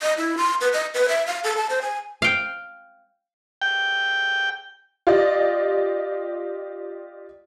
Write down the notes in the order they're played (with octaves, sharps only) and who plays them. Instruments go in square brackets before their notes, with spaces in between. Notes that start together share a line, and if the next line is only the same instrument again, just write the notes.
[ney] D#5
E4
C6
B4
D#5
B4
E5
F5
A4
A5
C5
G#5
[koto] F5 G5
[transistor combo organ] G5
[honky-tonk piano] F4 G4 D5 D#5